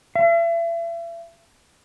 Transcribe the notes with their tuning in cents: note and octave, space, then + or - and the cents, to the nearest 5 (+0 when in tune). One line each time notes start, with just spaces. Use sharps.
E5 +40